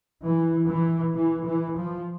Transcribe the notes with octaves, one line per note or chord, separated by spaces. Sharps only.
E3
E3
E3
E3
F3